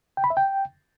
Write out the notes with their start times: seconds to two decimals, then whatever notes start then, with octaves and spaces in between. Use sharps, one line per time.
0.17 G5
0.24 B5
0.30 E5
0.37 G5